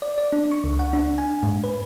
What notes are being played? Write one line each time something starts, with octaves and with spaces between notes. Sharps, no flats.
D5
D5
D4
C#6
C#2
F#5
D4
G#5
G#2
B4